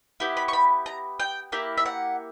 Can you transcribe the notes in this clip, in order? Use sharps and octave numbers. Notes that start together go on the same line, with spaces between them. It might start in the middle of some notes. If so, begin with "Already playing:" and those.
B3 E4 G4
B5
C#6
B5
A#5
G5
A#3 E4 G4
E5
F#5